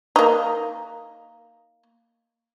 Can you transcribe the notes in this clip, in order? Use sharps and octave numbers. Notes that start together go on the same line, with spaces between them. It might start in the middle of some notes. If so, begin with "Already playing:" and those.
A#3 D#4